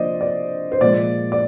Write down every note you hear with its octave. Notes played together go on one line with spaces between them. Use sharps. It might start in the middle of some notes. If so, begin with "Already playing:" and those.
Already playing: D3 F3 A#3 C5 D5 D#5
D5
C5
A#2 F3 G#3 D5
D5